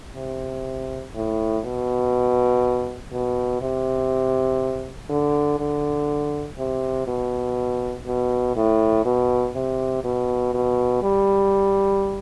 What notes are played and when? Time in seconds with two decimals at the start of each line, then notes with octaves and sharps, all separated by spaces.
0.16 C3
1.15 A2
1.64 B2
3.13 B2
3.62 C3
5.10 D3
5.59 D3
6.58 C3
7.07 B2
8.07 B2
8.56 A2
9.05 B2
9.55 C3
10.04 B2
10.54 B2
11.03 G3